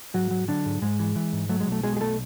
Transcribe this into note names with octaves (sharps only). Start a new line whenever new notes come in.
G#2 F#3 F#4
F#3
D3 F#3 D4
G#2
G#2 G#3
E3
E3
G#2
F#3 A3
G#3
B1 A3
B2 G#3 G#4
G#4
B1 A3 A4